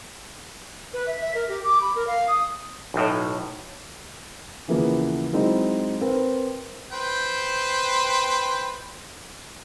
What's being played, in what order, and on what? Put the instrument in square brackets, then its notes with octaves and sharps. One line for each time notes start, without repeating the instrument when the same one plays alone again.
[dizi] B4
E5
E5
A#4
G4
D6
B5
A#4
F5
D#6
[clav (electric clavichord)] B1 A2
[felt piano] D#2 C#3 E3 F3 A#3 B3
F#3 G#3 C4 D#4 E4
C4 A#4 B4
[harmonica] B4 C5 G5